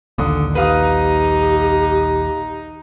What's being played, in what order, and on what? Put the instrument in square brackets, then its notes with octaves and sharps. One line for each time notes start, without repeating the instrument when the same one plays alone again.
[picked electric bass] A#1 D#2 A#2 [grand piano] D3 D#6
[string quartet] D#4 [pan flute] G4 [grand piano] B4 F5 D#6